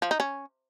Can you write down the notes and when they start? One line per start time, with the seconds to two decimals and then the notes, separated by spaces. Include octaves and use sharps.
0.02 F3
0.11 D#4
0.20 C#4